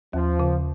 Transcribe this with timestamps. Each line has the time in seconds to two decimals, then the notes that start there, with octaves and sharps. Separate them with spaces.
0.13 D#2 F3
0.40 C#3